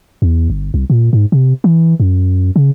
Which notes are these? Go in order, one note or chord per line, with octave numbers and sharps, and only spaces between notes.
E2
G1
C2
A#2
G#2
C3
E3
F#2
C#3